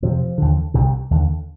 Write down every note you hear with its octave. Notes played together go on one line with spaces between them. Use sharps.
F2 C3 F3
D#2 D3
C2 C3
D#2 D3